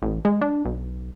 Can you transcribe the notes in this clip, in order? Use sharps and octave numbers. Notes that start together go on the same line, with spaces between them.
A1
G#3
D4
B1